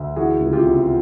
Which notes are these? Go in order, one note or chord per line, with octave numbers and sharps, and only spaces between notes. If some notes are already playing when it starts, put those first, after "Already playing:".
Already playing: D2
E3 F#4 G#4
C#2
F4 G4
C3